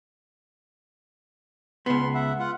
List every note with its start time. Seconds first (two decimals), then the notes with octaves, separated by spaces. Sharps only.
1.86 C#2 B3 C6
2.14 E5 F#5
2.39 F4 F#5